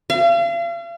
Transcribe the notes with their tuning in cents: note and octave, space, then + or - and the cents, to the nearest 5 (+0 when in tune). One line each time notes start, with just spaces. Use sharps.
F5 -40